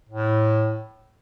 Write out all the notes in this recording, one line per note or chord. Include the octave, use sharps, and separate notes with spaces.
A2